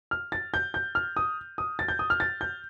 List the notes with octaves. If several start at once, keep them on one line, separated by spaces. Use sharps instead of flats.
F6
A6
G6
G6
F6
D#6
D#6
A6
G6
D#6
F6
A6
G6